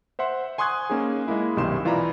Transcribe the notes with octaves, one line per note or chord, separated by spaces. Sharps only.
C5 E5 F#5 C6
G#5 C6 C#6 D#6 F#6 G#6
A#3 C#4 D#4 G#4
G#3 A#3 E4
B1 G2 C3 D#3 C6 E7
E3 F4 D5 E5 A#5 B5